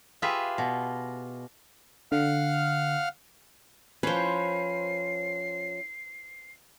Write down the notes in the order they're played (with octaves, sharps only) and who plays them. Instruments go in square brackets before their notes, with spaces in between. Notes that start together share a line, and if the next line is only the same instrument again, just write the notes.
[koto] F4 G4 G#4 B4 E5
B2
[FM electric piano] D3 [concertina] F5 F#5 F6
[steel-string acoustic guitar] F3 C#4 [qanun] B4 C5 [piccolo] C7